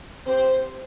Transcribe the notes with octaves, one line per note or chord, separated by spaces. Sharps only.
C4 G4 C5